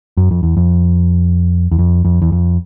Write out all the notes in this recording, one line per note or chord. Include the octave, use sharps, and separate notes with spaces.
F#2
F2
E2
F2
E2
F2
F2
E2
F2